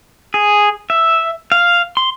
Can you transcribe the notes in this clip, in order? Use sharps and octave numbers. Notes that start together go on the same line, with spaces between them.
G#4
E5
F5
C6